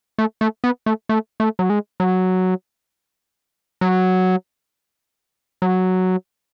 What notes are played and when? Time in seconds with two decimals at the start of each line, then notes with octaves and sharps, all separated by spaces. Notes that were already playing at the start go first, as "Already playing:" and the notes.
0.18 A3
0.41 A3
0.64 B3
0.86 A3
1.09 A3
1.40 A3
1.59 F#3
1.70 G#3
2.00 F#3
3.81 F#3
5.62 F#3